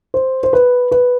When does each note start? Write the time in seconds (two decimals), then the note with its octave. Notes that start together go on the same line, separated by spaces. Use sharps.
0.14 C5
0.43 C5
0.53 B4
0.91 B4